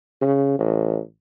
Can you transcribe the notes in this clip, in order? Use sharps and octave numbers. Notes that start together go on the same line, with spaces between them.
C#3
A1